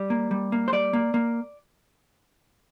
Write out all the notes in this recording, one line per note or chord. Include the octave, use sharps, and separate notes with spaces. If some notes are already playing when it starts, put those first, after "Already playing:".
Already playing: G3
A#3
G3
A#3
C5
G3 D5
A#3
A#3